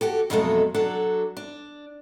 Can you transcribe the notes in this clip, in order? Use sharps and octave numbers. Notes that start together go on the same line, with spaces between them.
F#4 G4 A4
F2 B2 F#3 G#3 A3 A4
F#3 D4 F#4 A4
D4